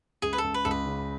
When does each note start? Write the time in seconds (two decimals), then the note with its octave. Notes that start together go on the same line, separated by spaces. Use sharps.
0.22 C#2 G#4
0.33 B4
0.38 A4
0.44 C#2
0.54 B4
0.65 C#2 A4
0.71 B4
0.86 C#3